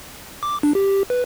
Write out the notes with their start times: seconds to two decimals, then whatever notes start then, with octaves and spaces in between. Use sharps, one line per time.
0.43 D6
0.63 D4
0.75 G4
1.10 B4